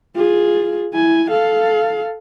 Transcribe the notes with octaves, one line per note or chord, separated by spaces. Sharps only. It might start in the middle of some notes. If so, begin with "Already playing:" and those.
F4 G#4
E4 G#5
A4 F5